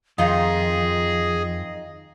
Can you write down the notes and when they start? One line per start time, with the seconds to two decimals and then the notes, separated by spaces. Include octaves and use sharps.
0.18 F2 D#3 D#4 F4 G#4 D#5